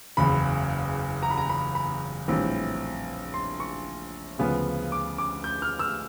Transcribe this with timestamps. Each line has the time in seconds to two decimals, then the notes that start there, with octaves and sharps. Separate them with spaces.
0.17 F#1 E2 C#3 B5
1.23 A#5
1.31 B5
1.38 A#5
1.50 B5
1.75 B5
2.28 A#1 A2 E3 G3 C4
3.34 C6
3.60 C#6
4.39 D2 C#3 F3 G#3 B3
4.92 D6
5.18 D6
5.44 G6
5.62 F6
5.79 E6